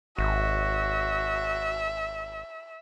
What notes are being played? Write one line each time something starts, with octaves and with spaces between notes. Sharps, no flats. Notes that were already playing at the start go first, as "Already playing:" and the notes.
G#1 F#4 E5